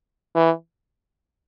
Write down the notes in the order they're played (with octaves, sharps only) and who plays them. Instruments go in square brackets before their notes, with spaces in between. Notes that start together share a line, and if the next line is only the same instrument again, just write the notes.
[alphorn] E3